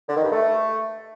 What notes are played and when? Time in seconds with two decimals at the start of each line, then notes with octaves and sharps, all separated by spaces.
0.09 D3
0.17 D#3
0.25 G2
0.32 A3